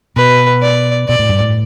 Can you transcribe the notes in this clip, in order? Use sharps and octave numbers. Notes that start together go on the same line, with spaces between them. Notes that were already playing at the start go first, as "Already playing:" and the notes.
B2 B4
D5
B2 D5
A2
G2
A2